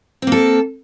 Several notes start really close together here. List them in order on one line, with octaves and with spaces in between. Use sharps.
C4 A#3 A4